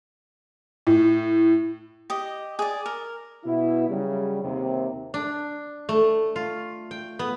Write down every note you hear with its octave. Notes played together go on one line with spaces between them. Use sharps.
A2
G4 D#5
G#4 D5
A#4
B2 E4
C#3 F#3 G3
D#2 C3
D4
A3
F4
G5
B3